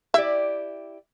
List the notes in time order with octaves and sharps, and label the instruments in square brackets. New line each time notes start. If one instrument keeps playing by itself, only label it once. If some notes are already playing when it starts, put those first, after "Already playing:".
[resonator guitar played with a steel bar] E4 G4 D5 [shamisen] E5